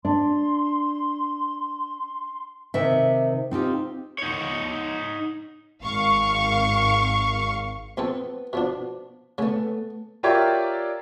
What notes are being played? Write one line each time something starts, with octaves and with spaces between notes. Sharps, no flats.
D4 C6
C3 D#3 E5
C4 D#4 F4 G4
D#4 C#5
G#1 F5 C#6
A#1 B3 C4 A4
B2 F3 D4
C#3 A3 B3
F4 G4 A#4 C#5 D5 E5